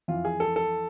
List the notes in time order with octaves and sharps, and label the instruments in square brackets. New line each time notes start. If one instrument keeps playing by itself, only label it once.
[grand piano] F2 E3 F4
G#4
A4
A4